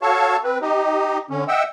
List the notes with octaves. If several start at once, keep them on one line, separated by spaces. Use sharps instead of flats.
F#4 A4 C#5 F5 A5 C#6
C4 B4
D#4 G4 D#5
D3 C#4
D#5 E5 F#5 G5 E6